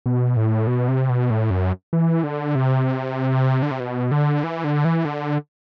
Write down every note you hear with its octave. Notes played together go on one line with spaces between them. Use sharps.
B2
A2
B2
C3
B2
A2
F#2
E3
D3
C3
D3
C3
B2
D3
E3
D3
E3
D3